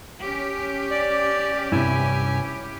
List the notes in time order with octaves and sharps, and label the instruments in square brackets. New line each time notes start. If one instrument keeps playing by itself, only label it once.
[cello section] C#4 G4
[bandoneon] D5
[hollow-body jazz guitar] G2 C3 [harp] E4 [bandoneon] G#5